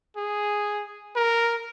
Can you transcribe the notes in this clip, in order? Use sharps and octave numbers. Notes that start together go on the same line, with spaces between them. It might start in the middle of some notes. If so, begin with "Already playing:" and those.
G#4
A#4